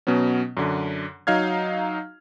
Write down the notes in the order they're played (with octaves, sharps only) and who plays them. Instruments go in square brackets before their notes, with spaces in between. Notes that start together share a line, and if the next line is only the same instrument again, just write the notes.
[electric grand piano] B2 F#3 B3 C#4
F#2 D3
F#3 D#4 F5 F6 G#6